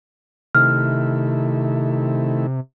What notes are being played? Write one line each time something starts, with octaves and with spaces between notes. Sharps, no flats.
C3 D#3 A3 E4 F6